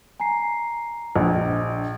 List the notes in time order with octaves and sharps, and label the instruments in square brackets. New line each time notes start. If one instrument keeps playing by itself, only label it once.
[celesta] G#5 A#5 C7
[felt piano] A#1 [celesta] D4 D#5